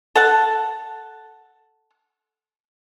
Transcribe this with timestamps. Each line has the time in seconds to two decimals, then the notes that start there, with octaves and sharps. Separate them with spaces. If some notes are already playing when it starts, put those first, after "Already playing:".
0.15 A4 F#5 A5